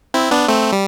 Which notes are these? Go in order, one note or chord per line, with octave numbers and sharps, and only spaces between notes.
C4 E4
B3 D4
A3 C4
G3